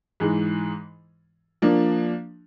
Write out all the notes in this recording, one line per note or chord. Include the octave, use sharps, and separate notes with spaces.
G#2 E3 G#3
F3 A#3 D4